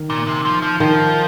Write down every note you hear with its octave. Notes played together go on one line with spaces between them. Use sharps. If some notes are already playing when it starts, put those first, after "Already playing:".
Already playing: D#3
A#2
C3
F3
F3
D#3 F3